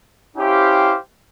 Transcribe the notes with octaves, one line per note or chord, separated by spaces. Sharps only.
C#4 E4 G4 C5 F5